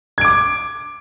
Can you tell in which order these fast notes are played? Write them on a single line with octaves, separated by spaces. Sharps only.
G#6 D7 D6